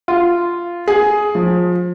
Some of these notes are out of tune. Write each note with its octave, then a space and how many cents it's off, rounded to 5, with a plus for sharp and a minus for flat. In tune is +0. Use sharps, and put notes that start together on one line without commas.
F4 -10
G#4 +10
F3 +25